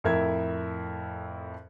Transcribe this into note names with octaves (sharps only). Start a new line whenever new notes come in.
F2 A2 A#4 E5 G#6